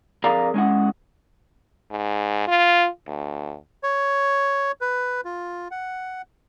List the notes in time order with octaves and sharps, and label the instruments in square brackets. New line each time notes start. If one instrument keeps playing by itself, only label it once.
[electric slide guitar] F2 G#4 A#4 D5 F5 A#5
G#3 C#4 E4 F#5
[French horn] G#2
F4
D2
[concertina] C#5
B4
F4
F#5